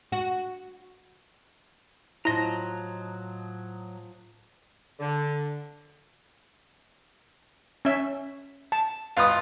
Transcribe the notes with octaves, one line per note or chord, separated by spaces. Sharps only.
F#4
A2 F3 F#3 E4 D#5 A#5 D#6 A#6
D3
C#4 E5
A5
G#1 F4 B4 D#6